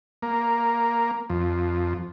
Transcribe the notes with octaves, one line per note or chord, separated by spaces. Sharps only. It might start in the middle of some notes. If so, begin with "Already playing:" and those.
A#3
F2